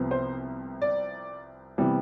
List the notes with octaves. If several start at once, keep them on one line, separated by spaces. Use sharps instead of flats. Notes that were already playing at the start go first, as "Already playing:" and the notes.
Already playing: C2 C3 F3 B3
C5
D5
C3 E3 G3 B3